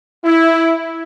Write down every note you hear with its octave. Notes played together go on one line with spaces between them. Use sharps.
E4